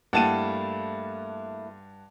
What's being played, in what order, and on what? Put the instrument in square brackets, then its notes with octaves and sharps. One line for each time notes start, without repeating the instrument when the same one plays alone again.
[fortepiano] G2 [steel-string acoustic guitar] A3 A#3 E4 [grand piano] F#5 A5 D#7